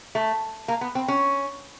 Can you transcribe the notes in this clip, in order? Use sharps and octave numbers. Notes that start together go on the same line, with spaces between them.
A3
A#3
B3
C4
C#4